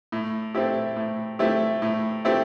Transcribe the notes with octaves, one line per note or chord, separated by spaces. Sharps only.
A2
A3 C4 E4 G4
A2
A3 C4 E4 G4
A2
A3 C4 E4 G4